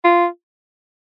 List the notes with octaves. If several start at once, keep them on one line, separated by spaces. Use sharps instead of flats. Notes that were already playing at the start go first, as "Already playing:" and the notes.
F4